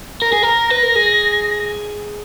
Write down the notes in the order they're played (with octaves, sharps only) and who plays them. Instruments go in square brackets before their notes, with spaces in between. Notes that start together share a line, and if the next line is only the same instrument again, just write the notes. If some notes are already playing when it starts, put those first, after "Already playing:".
[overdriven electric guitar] A#4 [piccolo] A#6
[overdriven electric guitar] G#4
A#4
B4
A#4
G#4